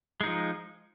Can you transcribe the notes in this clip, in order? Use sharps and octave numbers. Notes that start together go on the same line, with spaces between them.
F3 G#3 D#4